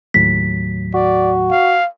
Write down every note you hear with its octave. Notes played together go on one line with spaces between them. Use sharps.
D#2 A2 F#3 B6
F#4 D5
F5